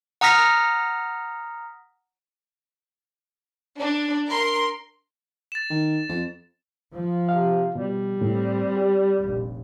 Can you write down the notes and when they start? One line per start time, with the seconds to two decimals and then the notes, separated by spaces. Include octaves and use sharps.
0.21 F#5 A#5 D#6 F6 A#6 B6
3.79 D4
4.28 A#4 C6
5.52 A6 E7
5.70 D#3
6.09 F2
6.92 F3
7.29 C3 F5
7.75 B2 G3
8.21 A2 C4
8.77 G4
9.18 F1 A#1